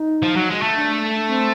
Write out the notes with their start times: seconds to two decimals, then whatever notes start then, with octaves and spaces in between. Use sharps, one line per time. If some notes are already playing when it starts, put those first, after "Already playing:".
Already playing: D#4
0.23 F3
0.36 F#3
0.50 G#3
0.62 A3
0.75 D4
1.28 C4